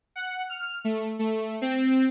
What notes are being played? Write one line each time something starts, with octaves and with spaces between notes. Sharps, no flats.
F#5
F6
A3
A3
C4